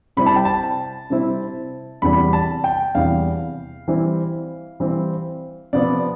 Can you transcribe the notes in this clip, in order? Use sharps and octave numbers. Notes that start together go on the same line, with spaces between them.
C3 G3 C4 E4 B5
A5
G5
A5
C3 G3 C4 E4
E2 C3 E3 G3 B5
A5
G5
E2 C3 E3 G3 F5
E3 G3 C4 E4
E3 G3 C4 E4
C3 F3 B3 D5